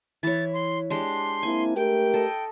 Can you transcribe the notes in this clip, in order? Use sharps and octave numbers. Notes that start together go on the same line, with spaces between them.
E3 C#5 A6
C6
G#3 D4 G4 C6
A#3 C4 E4 G#5
A3 G4 A#4 G5
A4 D#5